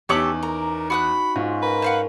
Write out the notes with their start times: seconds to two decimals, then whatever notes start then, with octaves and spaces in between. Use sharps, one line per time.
0.09 E2 C#4 D#4 G4 A4 C#5 D6 F#7
0.43 A#4 A#5
0.90 F#4 B5 D#6 F#6
1.36 G#2 C#4 F4
1.62 A#4 B4
1.82 C5 F5 F#5